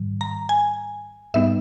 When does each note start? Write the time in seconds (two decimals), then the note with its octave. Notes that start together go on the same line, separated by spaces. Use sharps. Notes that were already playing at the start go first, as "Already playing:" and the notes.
Already playing: G#2 D#3 G3
0.21 A#5
0.49 G#5
1.34 G#2 G3 B3 D#4 E5